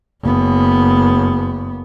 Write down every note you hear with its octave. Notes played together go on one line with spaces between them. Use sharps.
F#1 B3